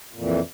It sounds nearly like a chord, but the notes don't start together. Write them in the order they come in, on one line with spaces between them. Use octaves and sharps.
A#2 F2 E3